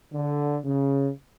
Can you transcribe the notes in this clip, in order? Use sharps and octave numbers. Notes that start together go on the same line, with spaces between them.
D3
C#3